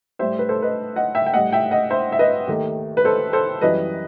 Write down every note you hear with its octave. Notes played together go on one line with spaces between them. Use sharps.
A2 G3 C5 E5
B4
A4 C5
B4 D#5
D#5 F#5
E5 G5
G5
A2 G3 D#5 F#5
E5 G5
D#5 F#5
C5 E5
E5
B4 D#5
D#2 D#3 A3
B4
A4 C5
A4 C5
F#2 E3 G3 B4 D#5